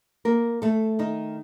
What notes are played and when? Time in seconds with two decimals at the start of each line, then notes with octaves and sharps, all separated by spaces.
0.25 A#3 A#4
0.62 A3 A4
0.99 D#3 D#4